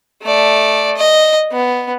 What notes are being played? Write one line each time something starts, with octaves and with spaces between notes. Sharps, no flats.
A3 D5
D#5
B3